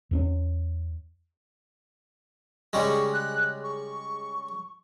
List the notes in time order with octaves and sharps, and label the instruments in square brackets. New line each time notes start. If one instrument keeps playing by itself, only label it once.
[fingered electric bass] E2 C4 C#4
[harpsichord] C#3 G3 G#3 [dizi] C#6
[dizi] F#6
C#6